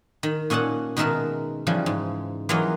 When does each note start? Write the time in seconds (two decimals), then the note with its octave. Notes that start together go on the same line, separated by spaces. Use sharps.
0.23 D#3
0.50 A#2 C#4 D#5 F#5 A5
0.97 B2 D#3 G#3 A#4 E5 A5
1.67 C#3 E3 F3 G3
1.86 G#2
2.49 E3 F#3 A#3 F4 D#5